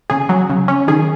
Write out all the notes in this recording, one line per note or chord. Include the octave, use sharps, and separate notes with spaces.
C#3 G#4
F#3
C#3
C#4
D#3 G#4